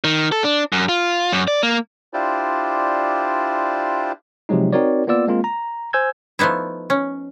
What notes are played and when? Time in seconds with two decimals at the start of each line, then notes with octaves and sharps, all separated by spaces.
0.04 D#3
0.32 A4
0.44 D4
0.72 F#2
0.89 F4
1.32 F#2
1.48 D5
1.63 A#3
2.13 D4 E4 F4 G4 C5 D5
4.49 C3 F3 F#3 G#3 D#4
4.73 C4 D#4 F#4 A#4 C#5 D5
5.07 A#3 B3 F4 D5 E6
5.28 G#3 A#3 C4 F4
5.44 A#5
5.93 C5 G#5 E6 G6 G#6
6.39 F3 A3 B3 D#4 E4
6.90 C#4